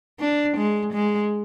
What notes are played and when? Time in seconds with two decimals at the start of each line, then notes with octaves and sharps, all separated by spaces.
0.20 D4
0.57 G#3
0.94 G#3